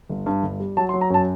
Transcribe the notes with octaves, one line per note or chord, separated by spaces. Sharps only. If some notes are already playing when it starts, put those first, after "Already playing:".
G1
G2
G1
G3
F#3 A5
C6
F#3
A#5
F#2 A5